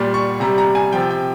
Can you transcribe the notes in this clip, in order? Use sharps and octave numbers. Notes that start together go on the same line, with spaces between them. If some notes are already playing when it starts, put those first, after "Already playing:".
Already playing: A#2 G3
C#6
C3 G3 A#5
A#5
G#5
C3 F3 G5
G5